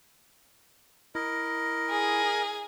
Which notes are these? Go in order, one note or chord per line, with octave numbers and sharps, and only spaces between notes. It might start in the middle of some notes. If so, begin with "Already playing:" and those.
E4 A#4 D#5
G#4